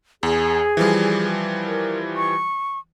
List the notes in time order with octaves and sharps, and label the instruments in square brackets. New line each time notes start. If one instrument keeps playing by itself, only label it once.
[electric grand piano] E2 [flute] G#4
[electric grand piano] E3 F3 G3
[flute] A#4
C#6